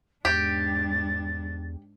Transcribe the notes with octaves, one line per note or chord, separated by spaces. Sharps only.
E2 G#2 D4 G4 A6